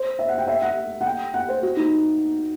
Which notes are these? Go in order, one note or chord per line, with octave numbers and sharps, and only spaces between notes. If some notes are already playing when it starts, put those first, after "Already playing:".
Already playing: C5
E5
F#5
G5
E5
F#5
F#5
G5
F#5
C5
F#4
D#4